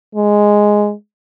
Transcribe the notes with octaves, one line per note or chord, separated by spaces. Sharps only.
G#3